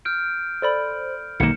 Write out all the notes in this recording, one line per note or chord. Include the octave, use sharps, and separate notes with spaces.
F6 G6 D7
A4 C5 D5 B5
B1 D#3 A#3 C#7 E7